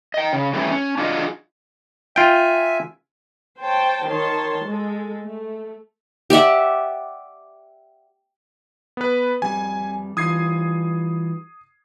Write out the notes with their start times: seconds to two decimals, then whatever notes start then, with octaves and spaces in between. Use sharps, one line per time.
0.14 D#5 G5
0.33 C#3
0.54 F#3 G3 A3 B3 C#4 E4
0.71 C#4
0.98 D4 F4 F#4 G#4 D#5
2.16 F4 E5 G5 G#5
3.61 C5 C#5 G5 A5
4.07 D#3 C#5 A5 C6
4.65 G#3 A4
5.24 A3
6.30 G4 D5 E5 F#5
8.97 B3 B4
9.42 F2 G3 G#5
10.17 E3 G3 F4 D#6 G#6 C7